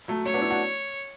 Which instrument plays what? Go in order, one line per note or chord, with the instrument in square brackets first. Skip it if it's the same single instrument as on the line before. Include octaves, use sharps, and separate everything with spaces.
[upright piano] F#3 A3
[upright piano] A3 C#4 [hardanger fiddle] C#5
[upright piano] B3 D4
C#4 E4
D4 F#4